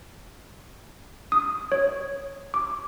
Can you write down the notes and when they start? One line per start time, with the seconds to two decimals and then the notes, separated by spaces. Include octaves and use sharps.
1.32 D#6
1.72 C#5
2.54 D6